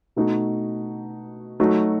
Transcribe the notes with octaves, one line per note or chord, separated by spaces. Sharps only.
B2 A3 D#4 F#4
F#3 A3 D#4 F#4